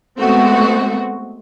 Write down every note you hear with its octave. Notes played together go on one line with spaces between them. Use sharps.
G#3 A3 B3 C4 F#4